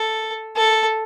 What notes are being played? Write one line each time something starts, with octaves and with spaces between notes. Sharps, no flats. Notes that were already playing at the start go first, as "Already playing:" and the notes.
Already playing: A4
A4